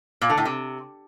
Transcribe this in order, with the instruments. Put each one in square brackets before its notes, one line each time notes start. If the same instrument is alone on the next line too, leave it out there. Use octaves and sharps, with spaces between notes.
[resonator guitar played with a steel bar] A#2
D3
A2
C3